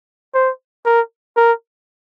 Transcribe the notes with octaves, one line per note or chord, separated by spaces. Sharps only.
C5
A#4
A#4